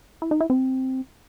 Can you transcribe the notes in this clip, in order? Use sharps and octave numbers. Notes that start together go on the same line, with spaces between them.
E4
D#4
E4
C4